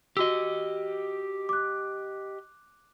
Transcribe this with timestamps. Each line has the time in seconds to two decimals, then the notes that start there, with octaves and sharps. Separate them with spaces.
0.17 F#4 G4 D#5 E6
1.49 D6 F#6